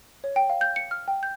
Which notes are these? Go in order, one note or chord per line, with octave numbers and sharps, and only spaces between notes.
C#5
G5
F5
G6
C#7
F6
G5
G6